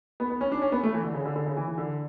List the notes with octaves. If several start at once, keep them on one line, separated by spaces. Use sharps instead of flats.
B3
B3
C#4
D4
C#4
B3
A3
E3
D3
C#3
D3
D3
C#3
E3
E3
D3